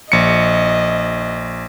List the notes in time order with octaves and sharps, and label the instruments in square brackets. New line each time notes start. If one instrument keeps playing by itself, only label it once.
[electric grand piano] A#1 C#7 [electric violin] D#5